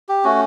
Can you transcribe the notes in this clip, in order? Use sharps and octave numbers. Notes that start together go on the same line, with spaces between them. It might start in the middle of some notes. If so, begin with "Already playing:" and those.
G4
A3 C#4 F#4